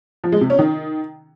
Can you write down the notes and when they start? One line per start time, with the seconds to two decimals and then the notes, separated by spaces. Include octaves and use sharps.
0.24 F3
0.32 G#3
0.41 C3
0.50 C#4
0.59 D#3